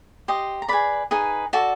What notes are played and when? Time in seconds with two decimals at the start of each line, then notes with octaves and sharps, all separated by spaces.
0.28 G4 C5 D#5
0.62 A#5
0.68 G#4 B4 D5 B5
1.11 D#4 G#4 B4
1.53 F#4 A4 D5 A5